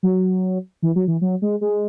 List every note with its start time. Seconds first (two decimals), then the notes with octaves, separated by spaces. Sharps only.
0.03 F#3
0.82 E3
0.96 F#3
1.08 E3
1.21 F#3
1.42 G#3
1.61 G#3